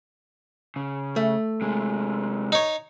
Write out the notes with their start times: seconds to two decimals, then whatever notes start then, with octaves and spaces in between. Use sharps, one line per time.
0.76 C#3
1.16 A3
1.62 C3 G#3
2.52 D#4 C#5